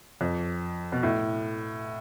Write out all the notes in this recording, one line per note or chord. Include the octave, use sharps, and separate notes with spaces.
F2
B2
A2